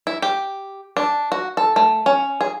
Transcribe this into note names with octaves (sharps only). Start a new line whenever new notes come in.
E4
G4
D4
F#4
A4
A3
C#4
G#4